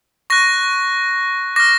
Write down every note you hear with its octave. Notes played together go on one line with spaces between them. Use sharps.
C#6 F#6 A#6
D6 F6 A#6